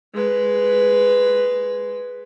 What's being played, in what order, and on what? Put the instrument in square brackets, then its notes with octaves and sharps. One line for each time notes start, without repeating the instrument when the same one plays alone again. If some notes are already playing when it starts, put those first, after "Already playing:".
[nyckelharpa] G#3 B4